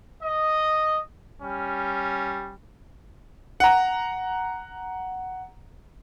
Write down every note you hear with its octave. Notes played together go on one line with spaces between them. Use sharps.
D#5
G3 C#4
F#5 A#5